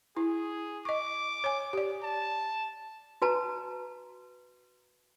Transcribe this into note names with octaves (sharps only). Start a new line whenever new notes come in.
E4 G#4
D#5 C#6 D6
C#5 G#5
G4 D5
A5
F#4 B4 A5 A#5